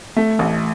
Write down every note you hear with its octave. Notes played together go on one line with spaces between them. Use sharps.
A3
A1